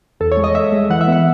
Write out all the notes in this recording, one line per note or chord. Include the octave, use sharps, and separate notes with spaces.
E2 A4
C#5
G#3
D#5
G#3 E5
G#3
E3 F#5
E5
B3 F#5